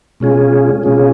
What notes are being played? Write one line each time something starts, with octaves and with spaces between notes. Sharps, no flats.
B2 G#3 C#4 F4 G#4
B2 G#3 C#4 F4 G#4